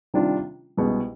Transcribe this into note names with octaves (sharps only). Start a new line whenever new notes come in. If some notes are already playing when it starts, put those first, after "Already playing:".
C3 D#3 G3 D4 F4
C2 B2 G#3